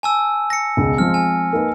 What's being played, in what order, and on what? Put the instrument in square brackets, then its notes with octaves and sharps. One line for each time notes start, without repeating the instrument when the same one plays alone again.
[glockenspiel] G#5 A5 E6
A#6 C#7
[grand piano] E1 C#2
[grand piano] F3 G#3 C4 [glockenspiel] F6
[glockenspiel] G#5
[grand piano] A#3 D#4 B4